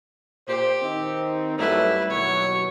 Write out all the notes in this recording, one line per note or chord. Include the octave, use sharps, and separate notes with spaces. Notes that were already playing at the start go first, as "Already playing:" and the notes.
A#2 G4 C5
D#3 C4 D#4
F#2 G3 A3 E4 B4
D#2 B2 F#3 C#5